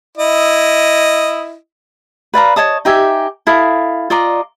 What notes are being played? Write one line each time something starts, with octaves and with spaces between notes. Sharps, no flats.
E4 D#5
B4 D5 F5 A#5
C#5 D#5 A5 D#6
D#4 G4 E5 G#5
E4 A4 F5 D#6
F4 D5 D#5 A#5